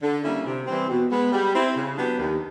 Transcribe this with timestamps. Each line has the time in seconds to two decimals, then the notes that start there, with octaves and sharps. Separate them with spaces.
0.02 D3
0.23 G3 A#3 C#4 E4
0.45 C3
0.67 E3 G3 C4
0.89 B2
1.10 G#3 B3
1.32 G3
1.54 C4 E4
1.76 C#3
1.97 F#3 B3 D4 G4
2.18 D#2